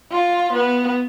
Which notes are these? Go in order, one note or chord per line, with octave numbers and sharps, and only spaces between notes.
F4
B3